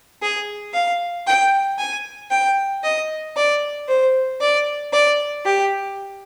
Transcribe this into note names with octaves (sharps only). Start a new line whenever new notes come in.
G#4
F5
G5
G#5
G5
D#5
D5
C5
D5
D5
G4